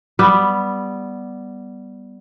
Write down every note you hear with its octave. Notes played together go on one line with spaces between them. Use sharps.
G3 B3